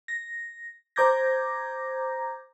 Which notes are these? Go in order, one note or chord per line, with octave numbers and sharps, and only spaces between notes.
A#6
C5 A#5 D6 G6 G#6 A#6